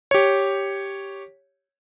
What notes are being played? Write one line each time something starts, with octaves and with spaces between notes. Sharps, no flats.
G4 C#5